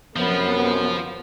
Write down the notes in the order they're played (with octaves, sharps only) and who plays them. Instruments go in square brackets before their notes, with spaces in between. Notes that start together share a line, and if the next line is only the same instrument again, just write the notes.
[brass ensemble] F#2 C3 [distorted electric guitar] F3 [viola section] B3